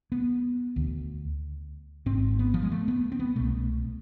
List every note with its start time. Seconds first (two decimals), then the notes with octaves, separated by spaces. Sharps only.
0.12 B3
0.76 D2 D3
2.06 G#1 G#2 C4
2.39 B3
2.54 F3
2.63 G#3
2.71 A3
2.88 B3
3.12 C4
3.19 B3
3.36 C2 B2 A3